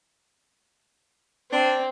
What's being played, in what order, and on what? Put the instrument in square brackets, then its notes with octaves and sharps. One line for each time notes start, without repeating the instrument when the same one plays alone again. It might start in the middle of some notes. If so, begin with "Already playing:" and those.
[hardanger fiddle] C4 [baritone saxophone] D4